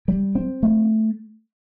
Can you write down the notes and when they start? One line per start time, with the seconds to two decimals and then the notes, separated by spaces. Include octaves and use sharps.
0.08 G3
0.35 C4
0.63 A3